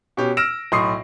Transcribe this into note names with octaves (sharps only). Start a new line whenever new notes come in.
B2 C#4 G4
E6 F6 A#6 D7 E7
B1 A2 C6 C#6 D#6 C7